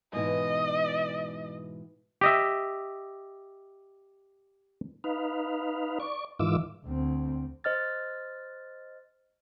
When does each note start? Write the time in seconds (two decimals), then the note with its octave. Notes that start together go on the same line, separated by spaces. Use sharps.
0.13 G#2 B2 E3 D#5
2.21 G4 D#5 E5
5.04 D#4 B4 F5
6.00 D5 C#6
6.39 G#2 D#3 E3 F4 D6 E6
6.86 D2 C4
7.64 C5 D#5 F6 A6